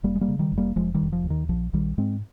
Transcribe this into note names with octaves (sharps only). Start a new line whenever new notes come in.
F1 G3 A#3
G#3
G3 A#3
C#3
D#3 G3
F1
G3 A#3
F1 F3 G#3
D#3 G3
F1
F3
D#2
D#3
A#1 F3
A#1 D#3 G3
G#2 G#3 C4